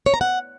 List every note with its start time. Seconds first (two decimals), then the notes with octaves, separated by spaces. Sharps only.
0.06 C#5
0.14 A#5
0.21 F#5